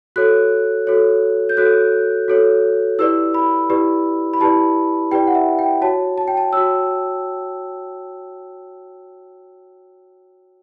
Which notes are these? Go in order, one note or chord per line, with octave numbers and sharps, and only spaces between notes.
F#4 A4 C#5 F#6
F#4 A4 C#5
G6
F#4 A4 C#5 F#6
F#4 A4 C#5
E4 G4 B4 D5 E6
B5
E4 G4 B4 D5
B5
E4 G4 B4 D5 A5
E4 G4 B4 D5 G5
F#5
E5
G5
F#4 C#5 A5
A5
G5
A5
F#4 C#5 E6